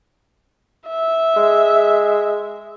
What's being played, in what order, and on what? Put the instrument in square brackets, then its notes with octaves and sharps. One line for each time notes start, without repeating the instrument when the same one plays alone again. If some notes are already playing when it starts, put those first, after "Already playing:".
[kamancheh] E5
[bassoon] G#3